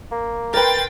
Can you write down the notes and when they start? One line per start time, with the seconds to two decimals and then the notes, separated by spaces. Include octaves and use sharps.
0.11 A#3
0.54 A#4 B4 G5 C6 A6